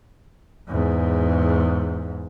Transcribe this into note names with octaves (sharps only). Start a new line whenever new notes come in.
E2 G#2